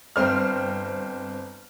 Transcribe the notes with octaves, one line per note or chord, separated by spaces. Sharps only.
G1 C4 C5 F6